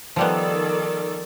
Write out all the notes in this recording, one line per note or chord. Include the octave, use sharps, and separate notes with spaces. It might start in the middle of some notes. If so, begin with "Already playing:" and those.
D#3 F3 G3 B3 A4 D5